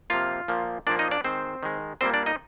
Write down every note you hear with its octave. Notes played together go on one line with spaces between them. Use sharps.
C3 F3 A#3 F4 F5
A#2 F3 A#3
A#2 F3 A#3 D4 D5
D#4 D#5
D4 D5
D#3 G#3 C4 C5
D#3 G#3
A#2 G3 A#3 C4 C5
D4 D5
D#4 D#5